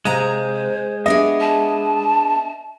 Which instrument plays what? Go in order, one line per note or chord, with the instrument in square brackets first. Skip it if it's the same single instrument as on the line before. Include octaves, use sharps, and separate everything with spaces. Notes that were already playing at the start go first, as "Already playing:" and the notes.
[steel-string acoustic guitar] C3 F5 A#5 [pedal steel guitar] G#3 [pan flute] C5
[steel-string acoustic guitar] B3 D4 G#4 [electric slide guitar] D#5 E5
[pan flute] A5